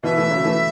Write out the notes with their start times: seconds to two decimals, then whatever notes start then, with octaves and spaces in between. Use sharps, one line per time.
0.03 B2 E3 E5
0.17 E3 A3
0.31 C#3 F#3
0.44 E3 A3